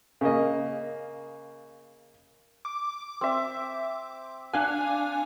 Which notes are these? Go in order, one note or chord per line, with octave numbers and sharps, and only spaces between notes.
C#3 A#3 D#5
D6
C4 E5
D4 F5 F#5 G#5